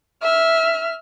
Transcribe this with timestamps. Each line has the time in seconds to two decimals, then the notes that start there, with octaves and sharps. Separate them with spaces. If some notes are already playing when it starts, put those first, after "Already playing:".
0.22 E5 F6